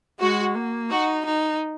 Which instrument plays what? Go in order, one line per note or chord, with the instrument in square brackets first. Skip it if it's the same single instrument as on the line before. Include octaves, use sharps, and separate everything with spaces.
[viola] G#3 [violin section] F#4
[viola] A#3
[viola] D#4 [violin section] F#4
[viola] D#4